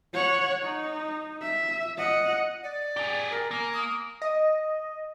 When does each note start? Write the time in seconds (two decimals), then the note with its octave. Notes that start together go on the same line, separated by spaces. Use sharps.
0.14 C#5 F#5
0.63 D#4
1.42 E5
1.98 D#5 F#5
2.63 D5
2.97 G4 G#4
3.31 A#4
3.51 A#3 G#5
3.74 D#6
4.22 D#5